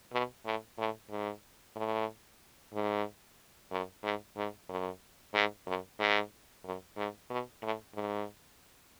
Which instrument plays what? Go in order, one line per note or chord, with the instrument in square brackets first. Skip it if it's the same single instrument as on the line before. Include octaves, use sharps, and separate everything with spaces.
[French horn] B2
A2
A2
G#2
A2
G#2
F#2
G#2
G#2
F#2
G#2
F#2
G#2
F#2
G#2
B2
A2
G#2